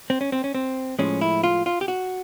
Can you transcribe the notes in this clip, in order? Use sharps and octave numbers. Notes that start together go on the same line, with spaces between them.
C4
C#4
C4
C#4
C4
A2 F3 G#3 C#4
E4
F4
F4
G4
F#4